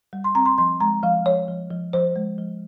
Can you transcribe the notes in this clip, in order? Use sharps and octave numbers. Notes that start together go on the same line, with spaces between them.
G3
C6
C4 A#5
C6
F3 C6
G#3 A#5
F3 F5
F3 C#5
F3
F3
F3 C5
G#3
F3